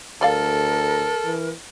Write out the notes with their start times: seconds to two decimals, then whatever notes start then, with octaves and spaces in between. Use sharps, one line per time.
0.21 D2 G3 A4 A#4 D5 F5
1.24 E3